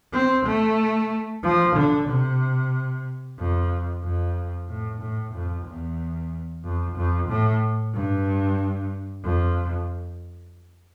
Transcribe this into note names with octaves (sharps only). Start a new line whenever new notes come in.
C4
A3
F3
D3
C3
F2
F2
A2
A2
F2
E2
F2
F2
A2
G2
F2